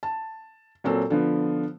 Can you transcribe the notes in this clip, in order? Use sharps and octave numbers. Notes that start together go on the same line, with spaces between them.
A5
A#2 F#3 C4 A4
D3 F3 B3